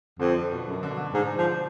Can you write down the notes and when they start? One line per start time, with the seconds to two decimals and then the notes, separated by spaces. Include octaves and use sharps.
0.19 F2 D3
0.51 B2
0.67 F#2
0.83 D3
0.90 B2
0.97 D3
1.14 G#2
1.38 F3